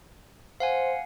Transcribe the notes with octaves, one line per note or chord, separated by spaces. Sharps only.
C5 F5 F#5 G#5